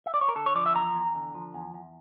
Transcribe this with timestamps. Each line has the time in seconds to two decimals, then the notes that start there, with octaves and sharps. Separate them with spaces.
0.06 E5
0.14 D5
0.21 C#5
0.28 A#4
0.35 D3 A4
0.46 C#5
0.55 F3 D5
0.66 E5
0.75 E2 A#5
0.95 E2
1.15 D3
1.35 F3
1.54 E2
1.74 E2